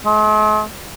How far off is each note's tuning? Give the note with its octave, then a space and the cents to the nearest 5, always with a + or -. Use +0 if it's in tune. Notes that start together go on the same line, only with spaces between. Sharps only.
G#3 +45